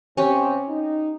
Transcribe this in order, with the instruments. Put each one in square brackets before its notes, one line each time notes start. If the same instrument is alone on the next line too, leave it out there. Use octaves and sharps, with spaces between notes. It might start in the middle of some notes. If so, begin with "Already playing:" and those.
[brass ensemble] C3 C4 [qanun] C#4 G4
[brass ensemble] D#4